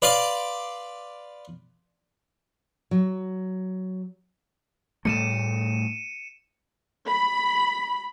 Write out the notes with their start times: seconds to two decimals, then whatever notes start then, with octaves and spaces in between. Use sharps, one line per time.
0.02 B4 D5 F5 C6 D6
2.91 F#3
5.05 A2 G3 A3 C#7 D#7 E7
7.06 B5